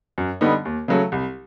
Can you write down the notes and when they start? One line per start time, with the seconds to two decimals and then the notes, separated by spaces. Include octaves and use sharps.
0.18 F#2
0.41 D3 G3 B3 D#4
0.65 D#2
0.88 C#3 F#3 A3
1.12 C2